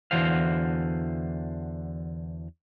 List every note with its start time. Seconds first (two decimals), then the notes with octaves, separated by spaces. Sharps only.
0.11 E2 D3 E3 F#4 C5 F5